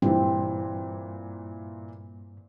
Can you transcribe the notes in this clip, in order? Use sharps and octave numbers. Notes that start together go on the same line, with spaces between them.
G2 A#2 E3 C4